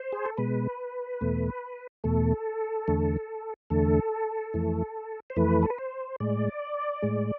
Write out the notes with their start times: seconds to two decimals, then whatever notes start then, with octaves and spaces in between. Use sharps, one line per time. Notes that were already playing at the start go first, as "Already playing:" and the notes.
Already playing: C5
0.12 G#4
0.26 A4
0.37 B2 G#3 B4
1.21 E2 B2 A3
2.04 E2 B2 A3 A4
2.88 E2 D3 A3
3.70 E2 D3 A3 A4
4.54 F2 E3 A3
5.30 C5
5.36 F2 E3 A3 B4
5.63 A4
5.70 B4
5.78 C5
6.20 A2 G#3 D5
7.02 A2 G#3